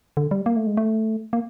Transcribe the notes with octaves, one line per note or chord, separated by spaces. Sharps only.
D3
G3
A#3
A3
G#3
A3
A#3